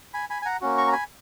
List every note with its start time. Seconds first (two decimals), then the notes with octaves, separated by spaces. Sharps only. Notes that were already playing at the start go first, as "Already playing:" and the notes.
0.14 G#5 B5
0.30 G#5 B5
0.42 G#5
0.46 F#5 A#5
0.61 A#3 C#4 F#4
0.78 A#5 C#6
0.88 A#5
0.92 G#5 B5